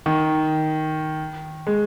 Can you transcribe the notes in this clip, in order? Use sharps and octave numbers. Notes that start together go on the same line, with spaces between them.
D#3
G#3